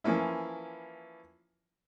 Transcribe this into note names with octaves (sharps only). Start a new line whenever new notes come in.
E3 F3 A#3 C#4 E4